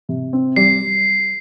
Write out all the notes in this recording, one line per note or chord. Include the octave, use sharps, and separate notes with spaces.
C3
C4
G3 C7